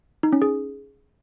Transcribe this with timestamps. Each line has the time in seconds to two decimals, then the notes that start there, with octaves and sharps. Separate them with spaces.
0.23 D#4
0.32 C#4
0.42 G#4